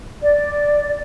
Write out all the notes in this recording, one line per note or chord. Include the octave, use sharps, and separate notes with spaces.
D5